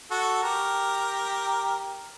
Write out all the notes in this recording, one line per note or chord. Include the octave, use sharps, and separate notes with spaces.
F#4 A4
G4 A#4